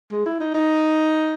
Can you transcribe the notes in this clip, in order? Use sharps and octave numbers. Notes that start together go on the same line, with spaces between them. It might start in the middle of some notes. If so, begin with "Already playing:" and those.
G#3
E4
D#4
D#4